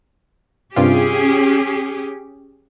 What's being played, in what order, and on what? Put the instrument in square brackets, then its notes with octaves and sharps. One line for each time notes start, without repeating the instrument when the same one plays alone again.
[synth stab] G2 C3 F4 [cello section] C#4 G4 G#4